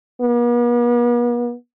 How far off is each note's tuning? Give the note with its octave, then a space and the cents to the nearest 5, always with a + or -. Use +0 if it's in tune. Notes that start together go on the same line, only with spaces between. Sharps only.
B3 -45